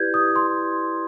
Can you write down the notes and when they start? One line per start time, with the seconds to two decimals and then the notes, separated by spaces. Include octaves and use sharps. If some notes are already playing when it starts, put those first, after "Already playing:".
Already playing: E4 G4 B4 D5 G6 G#6
0.14 D#6
0.36 C6